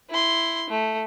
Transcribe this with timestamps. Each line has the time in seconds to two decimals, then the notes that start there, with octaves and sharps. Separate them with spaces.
0.10 E4 C6
0.70 A3